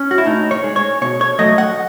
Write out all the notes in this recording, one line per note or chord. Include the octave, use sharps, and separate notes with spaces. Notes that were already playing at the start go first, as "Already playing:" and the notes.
Already playing: C#4
F#4
E4
A2 D#4
C#5
G#3
C#5
B2 C#5
C#5
F#3 A3 D#5
F#5